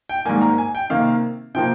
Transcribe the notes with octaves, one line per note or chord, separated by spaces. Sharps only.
G5
G#2 D#3 G3 A#3 G#5
A#5
G#5
G5
C3 D#3 A#3 F5
C3 F3 A#3 G5